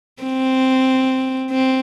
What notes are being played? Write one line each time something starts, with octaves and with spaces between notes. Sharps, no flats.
C4
C4